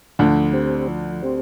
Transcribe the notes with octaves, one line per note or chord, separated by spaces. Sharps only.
D2 D3 F3
C4 G4 C5
F3
C4 G4 C5